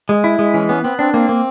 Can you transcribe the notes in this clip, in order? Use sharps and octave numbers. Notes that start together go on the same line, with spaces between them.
G#3
E4
G#3
E3 C#4
B3 C#4
B3 C4
C4 D4
A#3 C4
A#3